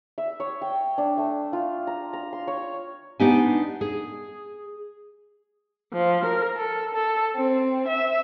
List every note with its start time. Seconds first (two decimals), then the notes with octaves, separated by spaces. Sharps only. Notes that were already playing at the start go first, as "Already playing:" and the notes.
0.18 E5
0.40 C#5
0.61 G5
0.98 D4
1.18 A3
1.53 F4
1.87 A#5
2.13 A#5
2.33 C6
2.48 C#5
3.20 B3 D4 D#4 G4 D#5 G#5
3.81 G#4
5.93 F3
6.25 A#4
6.56 A4
6.93 A4
7.35 C4
7.87 E5